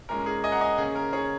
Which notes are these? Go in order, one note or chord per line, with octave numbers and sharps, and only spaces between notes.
A#2 G#3 C#4 A#4
G#4
D#5 G#5
F#5 A#5
D#5 G#5
C#3 A#3 C#4 G#4
A#4
G#4 C#5